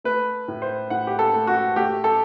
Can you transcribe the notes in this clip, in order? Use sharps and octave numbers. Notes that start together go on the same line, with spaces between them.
A3 B4
A2
C5
A2 F#5
G4
A4
A3
F#4
A3 G4
A4